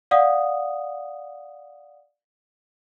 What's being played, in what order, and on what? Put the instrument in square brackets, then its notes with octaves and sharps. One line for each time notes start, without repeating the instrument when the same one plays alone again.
[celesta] D5 F5 F#5 D#6